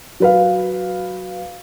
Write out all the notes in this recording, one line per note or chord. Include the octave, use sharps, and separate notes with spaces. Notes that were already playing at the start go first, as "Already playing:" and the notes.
F#3 B4 F5